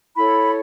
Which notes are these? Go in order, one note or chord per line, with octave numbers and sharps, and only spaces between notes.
E4 A4 C#5 B5